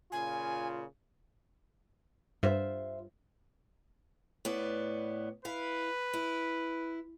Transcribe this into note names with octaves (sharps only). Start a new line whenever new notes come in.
A#2 C#3 F4 G#5
G2 F4 C5 E5
A2 B3 D5
E4 B4 F5
E4